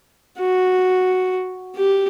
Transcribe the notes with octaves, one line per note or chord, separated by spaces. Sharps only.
F#4
G4